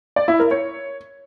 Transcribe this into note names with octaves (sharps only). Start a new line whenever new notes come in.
D5
E4
A#4
C#5